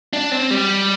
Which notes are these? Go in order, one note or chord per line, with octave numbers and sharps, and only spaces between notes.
D4
C4
G3